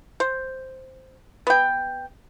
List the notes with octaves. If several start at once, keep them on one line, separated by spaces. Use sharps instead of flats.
C5
B3 G5